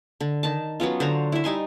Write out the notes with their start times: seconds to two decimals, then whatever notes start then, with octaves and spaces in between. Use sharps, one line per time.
0.21 D3
0.43 D#3 A5
0.80 F#3 B3 C#4 F4
1.00 D3 C5 C#5 A#5
1.32 E4 E5
1.44 G3 D#4 G#5 C6